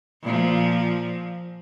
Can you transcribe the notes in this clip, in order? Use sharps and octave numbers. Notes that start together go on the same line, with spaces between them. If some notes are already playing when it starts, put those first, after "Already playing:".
A#2 F3